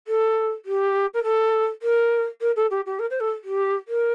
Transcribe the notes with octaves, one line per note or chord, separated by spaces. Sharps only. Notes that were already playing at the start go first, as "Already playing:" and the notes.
A4
G4
A#4
A4
A#4
A#4
A4
G4
G4
A#4
C5
A4
G4
A#4